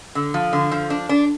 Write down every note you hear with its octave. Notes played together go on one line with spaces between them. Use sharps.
D3
F3
D3
F3
D4
D4